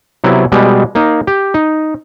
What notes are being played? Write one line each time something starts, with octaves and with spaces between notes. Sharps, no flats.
C3 F#3 B3 E4
B2 G3 G#3
A#3 D#4
G4
D#4